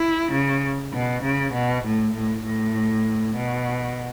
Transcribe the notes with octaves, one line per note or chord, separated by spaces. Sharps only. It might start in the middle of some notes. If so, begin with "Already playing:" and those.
Already playing: E4
C#3
B2
C#3
B2
A2
A2
A2
B2